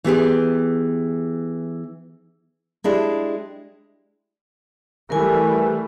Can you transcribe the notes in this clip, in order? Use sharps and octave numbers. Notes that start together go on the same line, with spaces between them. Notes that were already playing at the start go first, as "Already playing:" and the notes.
E3 B3 G4 G#4
G#3 D4 E4 G4
E3 G3 A3 A#4 G#5